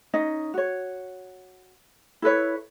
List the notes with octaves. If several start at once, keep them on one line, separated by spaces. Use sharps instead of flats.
C#4 D#4 D#5
F#4 C#5
E4 A4 B4 C#5